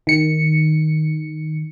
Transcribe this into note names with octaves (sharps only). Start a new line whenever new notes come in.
D#3 C#7